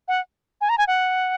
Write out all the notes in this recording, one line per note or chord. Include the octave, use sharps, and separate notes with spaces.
F#5
G#5
A#5
G#5
F#5